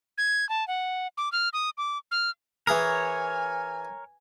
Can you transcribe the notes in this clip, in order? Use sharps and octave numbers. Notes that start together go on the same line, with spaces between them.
G#6
A5
F#5
D6
F6
D#6
D6
F6
E3 G#4 A#4 C#5 G#5 D#6